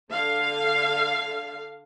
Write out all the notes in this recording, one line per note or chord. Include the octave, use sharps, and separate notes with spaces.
D3 F5